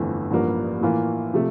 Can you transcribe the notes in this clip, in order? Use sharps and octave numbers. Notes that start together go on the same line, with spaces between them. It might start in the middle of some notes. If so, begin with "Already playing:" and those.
Already playing: G1 F2 E3 A3
A1 G2 F3 A#3
A2 E3 A#3 F4
C3 F3 A3